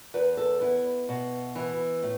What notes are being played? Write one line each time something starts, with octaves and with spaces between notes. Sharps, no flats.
E2 B4
A4
B3 E4
B2
E3
A2